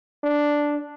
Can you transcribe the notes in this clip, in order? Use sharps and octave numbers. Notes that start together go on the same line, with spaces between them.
D4